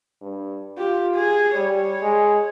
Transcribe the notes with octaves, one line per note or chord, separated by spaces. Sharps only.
G2
F4 G4
G#4
G3 C#5
G#3